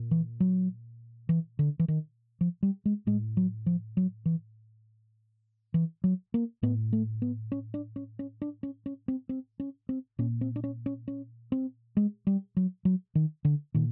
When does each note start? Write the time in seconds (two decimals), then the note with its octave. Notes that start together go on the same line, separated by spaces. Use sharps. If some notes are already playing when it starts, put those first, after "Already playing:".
Already playing: A#2
0.11 E3
0.40 F#3
1.29 E3
1.59 D3
1.79 E3
1.88 D#3
2.41 F3
2.63 G3
2.86 G#3
3.07 A2 G#3
3.37 F#3
3.66 F3
3.97 F#3
4.26 E3
5.74 E3
6.04 F#3
6.34 A#3
6.63 A2 B3
6.93 A3
7.22 B3
7.52 C#4
7.74 D4
7.96 C#4
8.19 C#4
8.42 D4
8.63 C#4
8.86 C#4
9.08 C4
9.29 C4
9.60 C#4
9.89 C4
10.19 A#2 C#4
10.41 C4
10.56 D4
10.64 C#4
10.86 C#4
11.08 C#4
11.52 C4
11.97 G#3
12.27 G3
12.57 F#3
12.85 F#3
13.15 D#3
13.45 D3
13.74 A#2 D#3